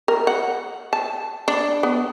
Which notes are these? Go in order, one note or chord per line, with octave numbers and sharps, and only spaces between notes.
A#4
F#5
A5
D4
B3